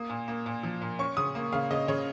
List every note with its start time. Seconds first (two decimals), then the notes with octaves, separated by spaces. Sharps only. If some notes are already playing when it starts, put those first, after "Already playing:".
Already playing: A#3 D#6
0.09 A#2
0.28 A#3
0.46 A#2
0.63 F3
0.81 A#2
0.99 C#4 C#6
1.17 C#3 D#6
1.35 A#3
1.52 C#3 F5
1.71 C#3 D#5
1.88 C#3 C#5